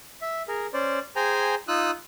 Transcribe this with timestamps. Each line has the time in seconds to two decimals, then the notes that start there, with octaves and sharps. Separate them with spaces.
0.22 E5
0.48 G#4 A#4
0.73 C#4 C5 D5
1.16 G#4 C5 G5 G#5 A#5
1.68 D#4 F4 D#6 E6 F#6